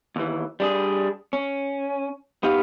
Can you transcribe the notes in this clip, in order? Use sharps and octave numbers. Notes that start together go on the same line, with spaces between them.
D#2 E3
G3 D4 G#4
C#4
B3 D#4 G4 F5